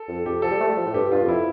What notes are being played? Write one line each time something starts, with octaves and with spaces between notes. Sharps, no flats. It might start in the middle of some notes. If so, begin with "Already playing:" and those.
Already playing: A4
F2
F2 G4
F3 A4
G3
A3
G3
F3
A2
G2 G4
G2 F4
F2
E4